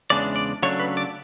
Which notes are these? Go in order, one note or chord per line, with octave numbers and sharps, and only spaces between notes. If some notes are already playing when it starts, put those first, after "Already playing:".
E2 C#3 G#3 D4 D5
D5
C#3 F#3 A3 D4 C#5
B4
D5